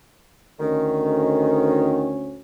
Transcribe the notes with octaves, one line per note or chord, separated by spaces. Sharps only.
D2 D#3 C#4